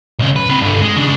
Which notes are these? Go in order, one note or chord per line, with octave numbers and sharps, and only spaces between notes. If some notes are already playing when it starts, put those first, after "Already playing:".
B1 C#3
B4
C4 B4
G2 D3
G#3
C#3 D4